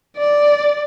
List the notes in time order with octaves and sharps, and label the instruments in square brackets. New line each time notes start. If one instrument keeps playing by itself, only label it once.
[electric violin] D5